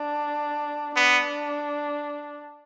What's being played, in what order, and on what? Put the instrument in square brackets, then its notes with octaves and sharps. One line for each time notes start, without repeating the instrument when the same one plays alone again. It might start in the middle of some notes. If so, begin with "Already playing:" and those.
Already playing: [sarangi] D4
[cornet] B3 [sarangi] D4